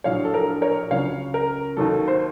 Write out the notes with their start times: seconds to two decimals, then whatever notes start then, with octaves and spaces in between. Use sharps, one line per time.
0.04 A#1 A2 F#3 C#5 F5
0.25 A4
0.34 A#4
0.62 A#4 C#5
0.91 C#2 C#3 F#3 C#5 F5
1.34 A#4
1.77 D#2 D#3 F#3 A4
2.08 C5